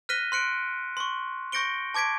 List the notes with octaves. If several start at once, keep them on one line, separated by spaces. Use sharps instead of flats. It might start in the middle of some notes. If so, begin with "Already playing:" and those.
F6 F#6 A#6 B6 D#7 G7
C6 F#6 C#7 D7
C6 C#6
C#6 G6 A#6 C#7 D7 G7
A5 D6 G#6 B6 D7